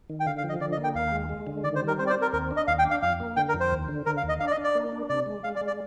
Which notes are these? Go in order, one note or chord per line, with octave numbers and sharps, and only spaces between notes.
D#3
G5
D3 F5
F5
F3
D#5
D3 D5
D#5
A#3
G5
D#2 F5
G#3
G#3
D3
D#3 D5
C5
G3
A#4
C4 C5
D5
C5
C4
A#4
D#2 A#4
D4
D#5
D#2 F5
G5
D4
F5
F2 F5
A#3
D3 G5
A#4
F2
C5
D#2
D3
D3 A#4
F5
D#2
D#5
D4 F5
D5
D#5
D4
D5
A#3
D4
C3 D5
G#3
G#3 F5
D5
G#3
D5